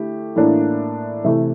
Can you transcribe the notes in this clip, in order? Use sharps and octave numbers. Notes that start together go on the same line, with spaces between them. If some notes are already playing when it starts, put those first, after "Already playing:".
Already playing: D3 A3 E4 G4
A2 E3 A#3 D4
C3 E3 A3